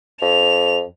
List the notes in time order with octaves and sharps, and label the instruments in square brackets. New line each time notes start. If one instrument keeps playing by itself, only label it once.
[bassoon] F2 [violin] F7